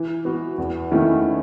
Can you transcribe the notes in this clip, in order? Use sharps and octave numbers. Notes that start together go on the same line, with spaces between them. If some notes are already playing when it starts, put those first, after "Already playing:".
Already playing: E3
B3 F#4
E2
D#3 A3 C#4 E4